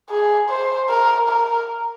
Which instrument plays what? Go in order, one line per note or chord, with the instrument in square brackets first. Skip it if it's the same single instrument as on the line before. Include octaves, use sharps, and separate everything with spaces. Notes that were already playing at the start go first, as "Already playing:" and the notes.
[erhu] G#4
C5
A#4
A#4